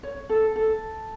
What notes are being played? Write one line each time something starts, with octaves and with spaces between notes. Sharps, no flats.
C#5
A4
A4